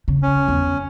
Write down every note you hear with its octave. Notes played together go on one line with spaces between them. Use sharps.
C#3
C#4
E2